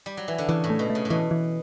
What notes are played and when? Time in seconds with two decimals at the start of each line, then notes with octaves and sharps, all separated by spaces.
0.06 G3
0.17 F#3
0.28 E3
0.38 D3
0.49 C#3 E3
0.64 A2
0.70 A3
0.79 B2
0.90 A3
0.95 C#3
1.05 A2
1.10 B2 E3
1.31 E3